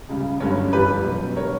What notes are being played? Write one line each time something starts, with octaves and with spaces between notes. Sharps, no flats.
C#2 C#3 G3
G1 G2 D3 F#3 C#4
G1 F#2 E3 G3 G4 B4
E2 B2 F#3
D3 G3 A#4 C#5